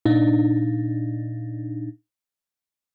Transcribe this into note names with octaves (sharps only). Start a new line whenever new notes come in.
A#2 D4 D#4